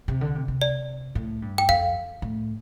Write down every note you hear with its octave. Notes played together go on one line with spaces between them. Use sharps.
C3
D3
C3
C3
D5
A2
G2
G5
F2 F5
A2